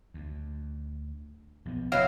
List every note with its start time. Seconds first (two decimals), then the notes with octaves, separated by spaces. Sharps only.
0.14 D2
1.65 B1 F3 B3
1.92 F1 F#3 E4 F5